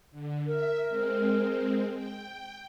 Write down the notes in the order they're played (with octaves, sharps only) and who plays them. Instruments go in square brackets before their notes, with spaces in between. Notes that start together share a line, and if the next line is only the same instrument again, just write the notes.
[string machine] D3
[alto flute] A#4 [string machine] E5
[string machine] G#3 C4
G5